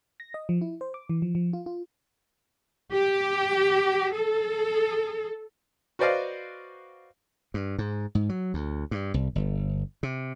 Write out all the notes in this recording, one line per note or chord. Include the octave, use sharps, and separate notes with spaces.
A#6
D#5
F3
E4
C5
D6
E3
F3
F3
F4
F4
G4
A4
F#4 B4 C5 D5 D#5 F5
G2
G#2
G#2
F#3
D2
G2
C2
G1
C3